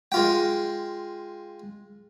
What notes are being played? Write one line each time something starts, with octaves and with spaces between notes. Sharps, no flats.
G#3 F4 G5